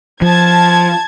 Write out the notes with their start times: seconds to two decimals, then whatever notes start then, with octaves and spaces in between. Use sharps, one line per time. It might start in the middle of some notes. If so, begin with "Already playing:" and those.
0.22 F3 A5 G#6